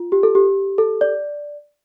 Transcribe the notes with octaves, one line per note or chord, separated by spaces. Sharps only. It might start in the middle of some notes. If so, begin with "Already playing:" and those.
Already playing: F4
G4
A4
G4
A4
D5